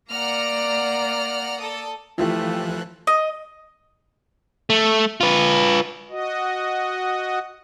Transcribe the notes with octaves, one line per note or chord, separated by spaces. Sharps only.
A#3 D5 F#5 A#5 F6
A4 D#6
E3 F3 A3 E4 F4 G4 F#6
D#5
A3
F4 B4
F#4 D#5